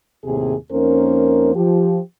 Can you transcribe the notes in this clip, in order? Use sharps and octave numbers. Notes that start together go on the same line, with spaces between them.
D#2 A2 C3 G#4
F2 A#3 C#4 D#4 A#4 C5
F3 G4